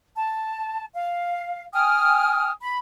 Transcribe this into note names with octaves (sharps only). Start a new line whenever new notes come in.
A5
F5
G5 G#5 D#6 F6
B5